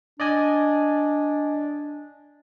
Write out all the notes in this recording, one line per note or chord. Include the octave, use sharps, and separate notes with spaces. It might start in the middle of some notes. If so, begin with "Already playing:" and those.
D4 D5 D#5 G#5